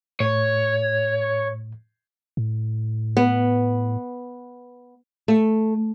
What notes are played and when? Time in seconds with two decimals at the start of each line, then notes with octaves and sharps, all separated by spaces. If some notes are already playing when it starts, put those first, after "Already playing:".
0.20 A2 C#5
2.37 A2
3.17 B3
5.28 A3